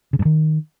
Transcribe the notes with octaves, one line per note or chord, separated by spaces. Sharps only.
C#3
G2
D#3